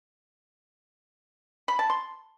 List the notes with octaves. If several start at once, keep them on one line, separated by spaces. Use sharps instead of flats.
B5
A5
C6